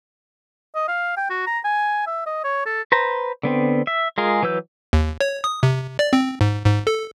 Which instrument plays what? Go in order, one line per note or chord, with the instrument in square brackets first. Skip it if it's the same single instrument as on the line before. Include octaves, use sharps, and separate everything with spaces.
[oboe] D#5
F5
G5
F#4
A#5
G#5
E5
D#5
C#5
A4
[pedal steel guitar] B4 C5 A#5
D3 B3 C4
E5
G#3 F4 G#4 A#4
E3 F#3 B4 E6 G6
[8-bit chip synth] D#2
C#5
D#6
C3
D5
C4
G#2
G#2
A4